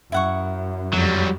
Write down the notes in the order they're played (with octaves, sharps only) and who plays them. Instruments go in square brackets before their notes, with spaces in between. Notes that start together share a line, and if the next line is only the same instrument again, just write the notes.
[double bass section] F#2 [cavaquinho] E4 F#5 C#6
[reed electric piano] F2 [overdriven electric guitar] F#3 G3